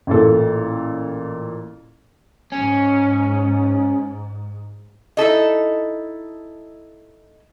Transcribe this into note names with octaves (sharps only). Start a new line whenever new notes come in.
A1 A#2 A4
G#2 C#4
D#4 E4 A4 D#5